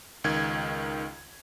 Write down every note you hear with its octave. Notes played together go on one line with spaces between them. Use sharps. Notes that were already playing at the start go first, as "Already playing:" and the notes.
C#2 D#3 G#6